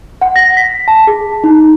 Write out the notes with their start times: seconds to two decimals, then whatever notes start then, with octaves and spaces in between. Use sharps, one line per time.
0.22 F#5
0.36 A#6
0.57 B6
0.88 A5
1.07 G#4
1.44 D#4